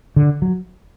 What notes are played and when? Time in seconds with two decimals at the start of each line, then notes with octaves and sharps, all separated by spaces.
0.16 D3
0.42 F#3